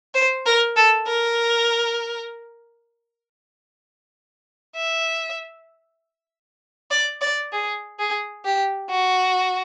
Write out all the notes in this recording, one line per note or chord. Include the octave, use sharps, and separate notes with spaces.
C5
A#4
A4
A#4
E5
D5
D5
G#4
G#4
G4
F#4